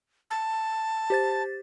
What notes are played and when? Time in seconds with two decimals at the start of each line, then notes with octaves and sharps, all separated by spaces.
0.31 A5
1.10 G4 C5 A6